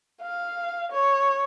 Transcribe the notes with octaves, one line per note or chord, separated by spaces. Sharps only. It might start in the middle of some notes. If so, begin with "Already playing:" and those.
F5
C#5